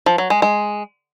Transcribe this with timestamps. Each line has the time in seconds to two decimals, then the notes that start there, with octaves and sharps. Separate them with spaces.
0.06 F3
0.18 F#3
0.30 G#3
0.42 G#3